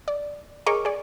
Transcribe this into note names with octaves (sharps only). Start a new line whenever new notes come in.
D5
G#4 A#4 C#5 D#5 C#6 D6
G#4 D5